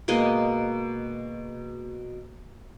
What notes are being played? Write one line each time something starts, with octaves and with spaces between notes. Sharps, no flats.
B2 G#3 A#3 D#5